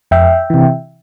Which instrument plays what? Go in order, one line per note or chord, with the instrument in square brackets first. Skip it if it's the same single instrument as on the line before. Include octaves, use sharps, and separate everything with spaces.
[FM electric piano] F2 E5 G5
C3 E3